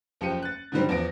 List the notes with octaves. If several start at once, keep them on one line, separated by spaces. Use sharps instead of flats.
F#1 F3 G4 C#7 D#7
F#6 A6
G#2 D3 D#3 F#3 G3 C4
E2 F3 B3 A#6 D7